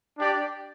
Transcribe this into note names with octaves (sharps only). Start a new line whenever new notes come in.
D4 G4 D5